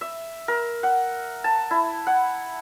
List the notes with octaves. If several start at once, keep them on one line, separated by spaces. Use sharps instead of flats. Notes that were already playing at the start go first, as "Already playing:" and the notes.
E5
A#4
F#5
A5
E4
F#5